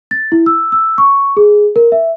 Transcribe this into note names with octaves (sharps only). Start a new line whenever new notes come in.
A6
E4
E6
E6
C#6
G#4
A#4
E5